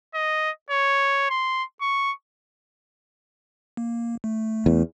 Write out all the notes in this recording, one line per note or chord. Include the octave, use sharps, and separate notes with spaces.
D#5
C#5
C6
C#6
A#3
A3
E2